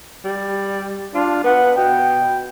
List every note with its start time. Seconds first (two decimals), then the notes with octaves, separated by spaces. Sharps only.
0.24 G3
1.15 D4 F4
1.44 B3 F#5
1.77 B2 G5